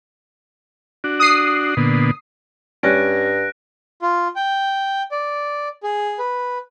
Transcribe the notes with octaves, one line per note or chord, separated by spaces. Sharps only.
D4 F#4
D#6 C7
A#2 D3 B3
G2 G3 C#4 F#6 A#6 D7
F4
G5
D5
G#4
B4